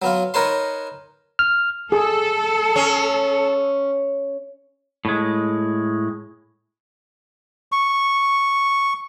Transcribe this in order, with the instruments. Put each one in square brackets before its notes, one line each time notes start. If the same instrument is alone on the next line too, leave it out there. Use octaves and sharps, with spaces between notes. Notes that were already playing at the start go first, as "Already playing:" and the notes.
[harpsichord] F#3 B3 F4
D#4 A#4 B4 C#5 A5 C6
[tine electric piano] F6
[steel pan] G#4 [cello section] A4
[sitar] C#4
[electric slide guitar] A2 G#3
[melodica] C#6